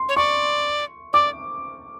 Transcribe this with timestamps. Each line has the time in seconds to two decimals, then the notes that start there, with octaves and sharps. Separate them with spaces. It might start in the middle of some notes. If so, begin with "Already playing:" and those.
Already playing: C6
0.09 C#5
0.16 D5 C#6
1.13 D5 D6